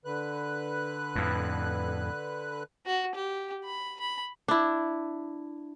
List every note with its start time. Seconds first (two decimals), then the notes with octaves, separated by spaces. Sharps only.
0.05 D3 B4 F#6
1.16 F2 A2
2.86 F#4
3.15 G4
3.64 B5
4.00 B5
4.48 D4 E4